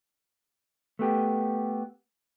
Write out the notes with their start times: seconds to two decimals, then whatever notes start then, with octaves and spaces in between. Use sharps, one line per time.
0.99 A3 B3 G4